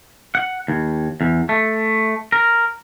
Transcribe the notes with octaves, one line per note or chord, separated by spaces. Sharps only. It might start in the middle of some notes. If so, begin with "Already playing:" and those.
F#5
D#2
E2
A3
A#4